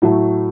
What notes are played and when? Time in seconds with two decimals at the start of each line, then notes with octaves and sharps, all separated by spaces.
0.02 A2 F#3 A3